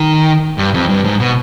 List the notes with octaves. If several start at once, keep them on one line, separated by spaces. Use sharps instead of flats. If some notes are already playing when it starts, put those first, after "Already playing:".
Already playing: D#3
G2
F2
G2
G#2
B2